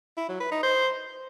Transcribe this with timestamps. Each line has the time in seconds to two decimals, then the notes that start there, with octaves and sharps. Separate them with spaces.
0.17 E4
0.29 F#3
0.40 B4
0.52 D#4
0.63 C5